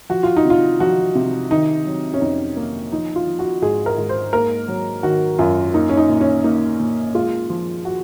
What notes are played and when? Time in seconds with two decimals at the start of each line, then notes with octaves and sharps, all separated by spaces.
0.09 F3 F#4
0.23 F4
0.36 D#4
0.45 C3 F4
0.80 F3 F#4
1.15 C3
1.51 D#3 D#4
1.86 F#3
2.14 C#4
2.21 F2 D#4
2.57 A#3
2.92 F3 D#4
3.16 F4
3.27 F3
3.39 F#4
3.62 G#2 G#4
3.86 A#4
3.98 G#2
4.09 C5
4.33 A#3 A#4
4.68 F#3
5.03 D#3 F#4
5.39 F#2 F4
5.74 A#3 D#4
5.89 C#4
5.97 D#4
6.09 A#2
6.21 C#4
6.44 A#3 D#4
6.80 A#2
7.15 G#3 F4
7.50 F3
7.85 F#4